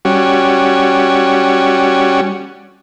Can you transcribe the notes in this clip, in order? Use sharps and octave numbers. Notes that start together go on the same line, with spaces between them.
G3 C#4 F#4